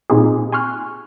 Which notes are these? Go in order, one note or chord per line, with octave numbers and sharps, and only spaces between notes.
A#2 C4 D#4 F4 G4 G#4
G#5 C6 C#6 F6 F#6